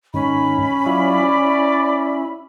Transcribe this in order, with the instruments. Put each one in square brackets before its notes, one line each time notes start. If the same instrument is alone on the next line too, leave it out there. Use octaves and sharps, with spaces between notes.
[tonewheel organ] G#2 D#3 [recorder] C#4 [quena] B5
[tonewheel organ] F#3 E4 F4 [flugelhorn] D5
[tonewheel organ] E4